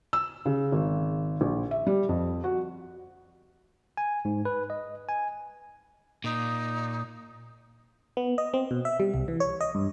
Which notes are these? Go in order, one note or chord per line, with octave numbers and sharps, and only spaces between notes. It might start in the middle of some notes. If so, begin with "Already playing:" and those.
E6
C#3
G#1
A#1
E5
G3
F2
F#4
G#5
G#2
B4
D#5
G#5
A#2 D#4
B3
D#5
C4
B2
E5
G3
C2
E3
C#5
D#5
G2